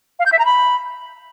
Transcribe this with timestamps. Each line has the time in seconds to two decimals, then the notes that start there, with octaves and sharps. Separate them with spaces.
0.19 F5
0.26 G6
0.32 E5
0.39 A#5
0.45 B5